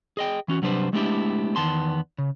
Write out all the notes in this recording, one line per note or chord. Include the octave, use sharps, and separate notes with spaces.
G#4 D#5 G5
E3 C#4 F#4
C3 F#3 G3 D4 B4 C5
G#3 A3 B3 D4 E4 G4
E2 D#3 B3 A5 C6
C#3